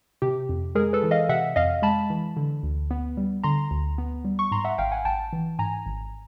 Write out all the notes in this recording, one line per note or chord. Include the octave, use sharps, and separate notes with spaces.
C3 G4
F2
G#3 G#4 A#4
A4 B4
E3
D#5 F5
C3 E5 F#5
F2 D#5 F5
G#3 A5 B5
E3
D3
D2
B3
G3
D3 A#5 C6
D2
B3
G3
C#6
G#2 A#5 C6
E5 F#5
G#1 F5 G5
F#5 G#5
G#1 G5 A5
E3
G#2 G#5 A#5
G#1